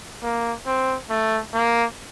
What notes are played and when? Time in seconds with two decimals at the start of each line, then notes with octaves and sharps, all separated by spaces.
0.23 A#3
0.66 C4
1.10 A3
1.54 A#3